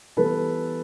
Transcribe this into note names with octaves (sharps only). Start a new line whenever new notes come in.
E3 G3 B3 A4 B4